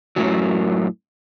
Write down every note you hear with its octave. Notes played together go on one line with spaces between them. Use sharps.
F#2 A2 C3 F#3